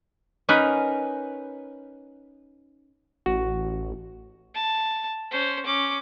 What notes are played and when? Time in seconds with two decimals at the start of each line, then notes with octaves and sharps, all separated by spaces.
0.49 C#4 D#4 A#4 B4
3.26 A1 F#4
4.55 A5
5.31 C#4 C5
5.66 C#4 D6